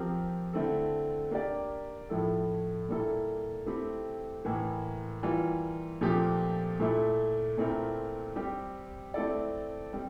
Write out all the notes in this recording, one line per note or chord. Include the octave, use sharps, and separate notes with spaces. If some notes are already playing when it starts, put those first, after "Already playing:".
Already playing: F3 C4 G4 A#4
D3 A3 C4 E4 A4
A#3 D4 G4 A#4 D5
A2 F3 A3 E4 A4
A#2 G3 A#3 E4 A4
A3 C4 E4 G4
A2 E3 A#3
E3 G3 A#3 F4
A#2 F3 A3 C4 G4
A#2 A3 E4 A4
A#2 A3 C4 E4 A#4
G3 C4 G4
A3 C4 E4 A4 D5
G3 C4